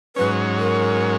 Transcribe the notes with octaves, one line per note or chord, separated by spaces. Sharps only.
G#2 F#3 C#4 B4
A#4